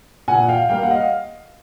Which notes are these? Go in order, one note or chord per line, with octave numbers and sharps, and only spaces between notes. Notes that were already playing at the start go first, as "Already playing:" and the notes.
A#2 F#5 G#5
F5 G5
G3 A#3 F5 G5
F#5
D#5 F5